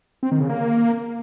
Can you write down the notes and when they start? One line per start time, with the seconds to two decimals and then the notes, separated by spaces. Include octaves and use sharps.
0.23 C4
0.32 D#3
0.40 C#3
0.49 A#3